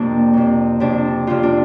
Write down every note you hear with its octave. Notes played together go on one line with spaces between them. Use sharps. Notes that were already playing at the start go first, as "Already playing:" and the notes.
Already playing: F2 C3 A#3 D4
F2 C3
F2 C3 D4
F2 C3 F4
D4